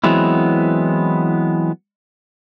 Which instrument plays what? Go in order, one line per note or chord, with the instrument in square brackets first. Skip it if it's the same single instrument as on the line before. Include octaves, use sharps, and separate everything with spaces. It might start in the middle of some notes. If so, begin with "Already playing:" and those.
[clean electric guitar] E3 F#3 G#3 B3 C4 E4